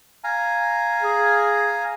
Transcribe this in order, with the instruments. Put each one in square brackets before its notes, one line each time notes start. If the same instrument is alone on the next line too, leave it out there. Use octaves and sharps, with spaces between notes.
[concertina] F5 G#5 A#5
[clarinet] G#4